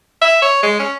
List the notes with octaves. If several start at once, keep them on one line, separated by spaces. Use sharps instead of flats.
E5
C#5
G#3
C#4